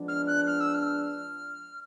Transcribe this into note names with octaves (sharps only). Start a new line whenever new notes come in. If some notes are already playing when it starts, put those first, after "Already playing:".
Already playing: F3 G#3 B3 D4
F6
F#6
F6
E6
F6